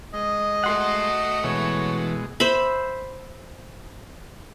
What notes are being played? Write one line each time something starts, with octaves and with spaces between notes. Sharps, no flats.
G#3 D#5
A3 F#4 F#5 C6
B2 E3 G#3 C#5
C5 E5 B5